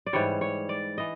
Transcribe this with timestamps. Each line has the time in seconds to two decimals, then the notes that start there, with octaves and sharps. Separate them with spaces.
0.06 D5
0.13 G#2 E3 G3 C#5
0.41 C#5
0.69 D5
0.98 E3 D#5